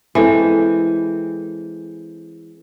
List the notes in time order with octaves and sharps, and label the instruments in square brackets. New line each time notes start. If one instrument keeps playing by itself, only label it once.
[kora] E3 [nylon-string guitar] G#3 C4 A4